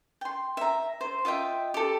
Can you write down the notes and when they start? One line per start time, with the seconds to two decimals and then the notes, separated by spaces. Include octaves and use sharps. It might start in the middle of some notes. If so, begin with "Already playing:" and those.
0.21 G5 C6
0.57 E5 A#5
1.01 C5
1.25 F4 D#5 E5 G5
1.74 G4 A4